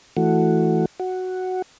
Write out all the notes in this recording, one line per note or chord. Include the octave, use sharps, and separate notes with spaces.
E3 A3 F#4
F#4